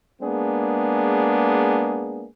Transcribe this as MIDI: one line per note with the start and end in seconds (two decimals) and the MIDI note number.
0.22 2.26 56
0.22 2.26 58
0.22 2.26 59
0.22 2.26 62
0.22 2.26 68